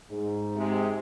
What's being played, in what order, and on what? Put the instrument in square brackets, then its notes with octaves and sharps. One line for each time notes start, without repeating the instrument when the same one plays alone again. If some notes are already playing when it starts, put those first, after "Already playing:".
[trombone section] G#2
[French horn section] C3 G#3